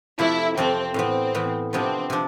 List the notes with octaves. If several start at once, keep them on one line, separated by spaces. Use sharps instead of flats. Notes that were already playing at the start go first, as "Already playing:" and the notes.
F2 C3 F3 A3 E4
F2 C3 F3 A3 C4
A2 E3 B3 C4
A2 E3 B3
C3 F3 B3 C4 D4
C3 F3 D4